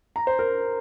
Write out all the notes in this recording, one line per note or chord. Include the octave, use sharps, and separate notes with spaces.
A#5
C5
A#4